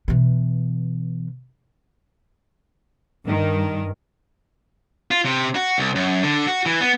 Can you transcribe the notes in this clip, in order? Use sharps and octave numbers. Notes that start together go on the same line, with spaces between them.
B2 E3
G2 D#3
F4
C3
F#4
C2
F#2
D3
F#4
E3
B3